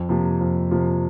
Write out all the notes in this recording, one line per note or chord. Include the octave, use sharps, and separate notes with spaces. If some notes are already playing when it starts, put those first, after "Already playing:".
Already playing: F2
C3 F3 A#3
F2
C3 F3 A#3